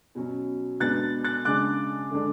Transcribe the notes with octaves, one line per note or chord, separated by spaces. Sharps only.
B2 F#3 C#4
B2 G#3 B3 D4 F#6 A6
F#6 A6
C#3 G#3 D4 D6 F#6
D3 G#3 D4